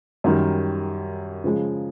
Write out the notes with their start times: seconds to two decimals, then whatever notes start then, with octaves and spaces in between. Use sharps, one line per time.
0.24 F#2 D#3 G3
1.44 C#3 F3 G#3